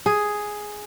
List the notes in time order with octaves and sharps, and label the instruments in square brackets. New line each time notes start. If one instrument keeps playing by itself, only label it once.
[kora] G#4